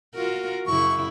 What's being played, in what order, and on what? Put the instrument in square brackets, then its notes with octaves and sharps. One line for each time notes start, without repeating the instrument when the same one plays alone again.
[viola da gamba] F4 F#4 A#4
[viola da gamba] F#2 C#3 E4 [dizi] C#6